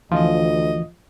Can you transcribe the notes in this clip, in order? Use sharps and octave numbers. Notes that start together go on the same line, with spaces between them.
D2 E3 F3 D#5